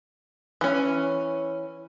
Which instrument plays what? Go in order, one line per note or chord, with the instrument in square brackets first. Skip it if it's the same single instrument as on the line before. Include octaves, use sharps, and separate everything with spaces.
[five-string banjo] E3 C#4